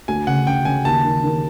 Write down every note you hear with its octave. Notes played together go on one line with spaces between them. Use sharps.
D2 G#5
C#3 F#5
C#3 G5
C#3 G#5
D#2 A5
D#3
D#3